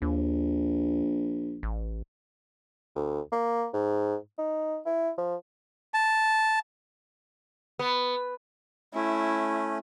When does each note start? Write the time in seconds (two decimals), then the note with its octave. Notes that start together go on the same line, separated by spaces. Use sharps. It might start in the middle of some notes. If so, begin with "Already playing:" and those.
0.02 A#1 D#2
1.63 A1
2.96 D2
3.32 A#3
3.73 G#2
4.38 D#4
4.86 E4
5.17 F3
5.94 A5
7.79 B3
8.94 A3 C#4 E4